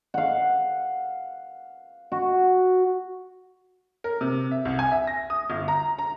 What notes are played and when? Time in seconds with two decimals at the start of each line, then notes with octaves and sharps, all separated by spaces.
0.14 F5 F#5
2.12 F#4
4.04 A#4
4.21 C3
4.51 E5
4.65 C2
4.79 G#5
4.92 E5
5.07 A#6
5.30 D#6
5.50 G1
5.68 A#5
5.99 A#5